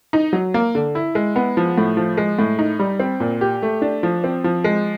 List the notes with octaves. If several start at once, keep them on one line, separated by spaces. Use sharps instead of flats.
D#4
F#3
A#3
D3
E4
G#3
B3
F3
A2
F3
G#3
A2
D#4
G3
C4
A#2
G4
A3
D4
F3
C4
F3
G#3